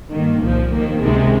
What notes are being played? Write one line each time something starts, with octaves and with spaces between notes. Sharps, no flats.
G2 D#3 A#3
C2 A#2 F3
D#2 D#3 A#3
C#2 C3 D#3 G#3